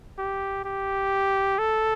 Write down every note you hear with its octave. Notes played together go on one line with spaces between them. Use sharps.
G4
G4
A4